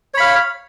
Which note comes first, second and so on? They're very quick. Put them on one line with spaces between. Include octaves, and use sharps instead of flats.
C#5 B5 F5